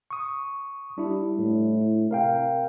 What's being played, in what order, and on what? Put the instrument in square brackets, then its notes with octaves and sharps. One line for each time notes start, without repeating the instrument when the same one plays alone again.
[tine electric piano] C#6 D#6
[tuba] G3 [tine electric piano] D4 E4
[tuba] A2
[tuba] C3 [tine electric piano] A#4 F5 G5